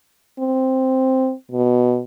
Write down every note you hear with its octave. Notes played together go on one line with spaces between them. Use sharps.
C4
B2